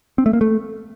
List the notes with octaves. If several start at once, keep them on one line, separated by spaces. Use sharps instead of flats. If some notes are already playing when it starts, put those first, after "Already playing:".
C4
A3
A#3
A3